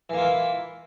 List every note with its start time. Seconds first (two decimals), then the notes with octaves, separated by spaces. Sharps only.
0.10 E3
0.13 A#3
0.17 F4
0.21 E4